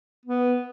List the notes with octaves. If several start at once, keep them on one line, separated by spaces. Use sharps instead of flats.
B3